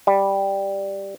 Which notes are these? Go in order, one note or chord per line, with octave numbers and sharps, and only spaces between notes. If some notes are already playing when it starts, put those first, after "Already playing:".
G3